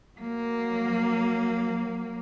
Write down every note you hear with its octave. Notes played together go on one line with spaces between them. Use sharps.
F#3 A#3